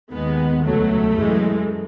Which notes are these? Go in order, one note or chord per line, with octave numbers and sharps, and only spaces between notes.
D#2 D#3 G#3 B3
C#2 B2 F#3 A3
F#2 E3 G#3